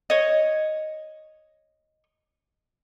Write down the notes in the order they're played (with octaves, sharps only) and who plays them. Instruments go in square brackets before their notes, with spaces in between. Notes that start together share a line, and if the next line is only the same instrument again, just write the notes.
[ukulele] C#5 D#5